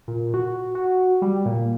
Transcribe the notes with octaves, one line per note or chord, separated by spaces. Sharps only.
A#2
F#4
F#4
G3
A#2